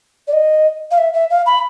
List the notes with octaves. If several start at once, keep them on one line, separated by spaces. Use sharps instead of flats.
D5
D#5
F5
E5
E5
F5
B5